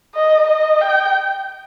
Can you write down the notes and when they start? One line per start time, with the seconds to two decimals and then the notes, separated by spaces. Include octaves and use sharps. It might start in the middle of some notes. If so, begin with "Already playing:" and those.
0.15 D#5
0.48 D#5
0.81 G5